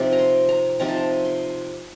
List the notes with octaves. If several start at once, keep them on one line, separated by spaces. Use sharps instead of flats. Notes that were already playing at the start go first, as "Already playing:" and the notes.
Already playing: C3 F3 C4 D#4
A#5
C6
A#5
C3 F3 C4 D#4 A#5
A5
A#5
C6